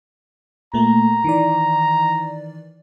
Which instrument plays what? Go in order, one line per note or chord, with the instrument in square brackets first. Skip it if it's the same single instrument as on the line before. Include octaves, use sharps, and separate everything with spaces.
[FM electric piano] A#2 A3 A#3 [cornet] A#5
[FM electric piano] D#3 E3 D5